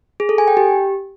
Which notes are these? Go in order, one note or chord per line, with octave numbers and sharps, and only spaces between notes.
G#4
A4
G#5
G5
G4